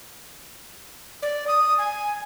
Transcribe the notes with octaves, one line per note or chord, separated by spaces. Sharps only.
D5
D#6
G#5